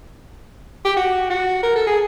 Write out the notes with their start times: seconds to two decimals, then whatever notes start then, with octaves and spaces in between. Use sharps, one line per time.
0.85 G4
0.96 F#4
1.30 F#4
1.63 A#4
1.76 A4
1.86 G#4